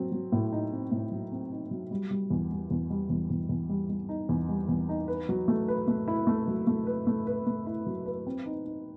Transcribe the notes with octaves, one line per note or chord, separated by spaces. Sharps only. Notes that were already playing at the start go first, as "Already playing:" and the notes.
Already playing: F#3 C4
F#3
A2
D#4
C4
A2
F#3
C4
D#4
F#3
G3
G3
E2
G3
E2
G3
E2
E2
E2
G3
G3
D#4
E2
G3
E2
D#4
B4
F#3
A3
B4
A3
E4
A3
F#3
A3
B4
A3
B4
A3
E4
F#3
B4
C4
D#4
D#4